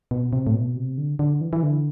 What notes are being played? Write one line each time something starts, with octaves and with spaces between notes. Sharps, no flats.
B2
C3
A2
B2
C3
D3
D3
E3
E3
D3